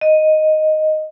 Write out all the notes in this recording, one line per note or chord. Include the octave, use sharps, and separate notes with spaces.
D#5